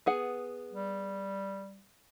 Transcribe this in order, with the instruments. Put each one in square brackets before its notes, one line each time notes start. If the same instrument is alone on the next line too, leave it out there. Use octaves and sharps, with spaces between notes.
[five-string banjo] B3 G#4 F#5
[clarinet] G3